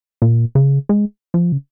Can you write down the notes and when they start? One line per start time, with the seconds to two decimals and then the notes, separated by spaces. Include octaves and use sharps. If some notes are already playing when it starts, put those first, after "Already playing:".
0.22 A#2
0.55 C#3
0.89 G#3
1.34 F3
1.52 C#3